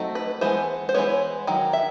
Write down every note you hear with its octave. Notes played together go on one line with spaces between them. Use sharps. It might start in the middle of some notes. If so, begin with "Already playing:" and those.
Already playing: F#3 A3 C4 D#4
B4
E3 G#3 B3 C5
C5
E3 G#3 B3 C#5
D#3 F#3
E5